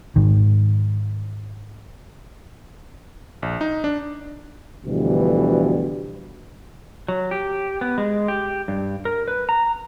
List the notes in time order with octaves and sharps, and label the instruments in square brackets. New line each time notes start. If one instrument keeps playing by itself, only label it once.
[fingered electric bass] G#2 D#3
[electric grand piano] A#1
D#4
D4
[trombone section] D2 B2 D3 E3 F3 G3
[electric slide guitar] F#3
G4
B3
G#3
G4
G2
A#4
B4
A#5